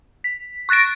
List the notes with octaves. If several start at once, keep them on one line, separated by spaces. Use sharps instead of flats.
B6
C#6 F#6 A6 A#6 D7